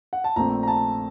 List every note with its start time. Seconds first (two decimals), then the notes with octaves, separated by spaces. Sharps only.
0.13 F#5
0.24 A5
0.36 A#1 A#2 A3 C4 A#5
0.63 A#5
0.68 A5